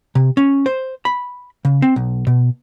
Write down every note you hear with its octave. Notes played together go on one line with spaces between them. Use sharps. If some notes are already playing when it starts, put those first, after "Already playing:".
C3
C#4
C5
B5
C#3
C4
B1
B2